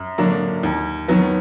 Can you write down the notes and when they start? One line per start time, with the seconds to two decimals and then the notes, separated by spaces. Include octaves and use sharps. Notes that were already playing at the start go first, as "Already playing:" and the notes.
Already playing: F#2
0.18 D3 F#3 A#3 D4
0.63 D#2
1.08 D#3 F#3 B3